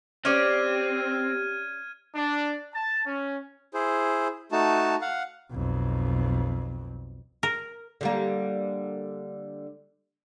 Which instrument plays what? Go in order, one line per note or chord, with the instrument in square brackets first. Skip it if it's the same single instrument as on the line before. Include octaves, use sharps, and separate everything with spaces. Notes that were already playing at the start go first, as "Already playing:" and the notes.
[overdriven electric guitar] C4 [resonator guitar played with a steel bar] C#4 D5 [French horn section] G4 [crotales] F6 G#6 D#7
[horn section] D4
A5
C#4
[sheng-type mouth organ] E4 G#4 C5
A3 D#4 F#4 A5
F5 F#5
[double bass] B1 F2
[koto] A#4
[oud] D3 G3 A#3